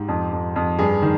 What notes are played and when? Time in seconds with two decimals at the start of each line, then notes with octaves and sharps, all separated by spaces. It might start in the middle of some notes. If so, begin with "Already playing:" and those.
Already playing: G#2 G4
0.08 F2
0.32 F2
0.56 F2
0.79 G2 G#4
1.02 D#3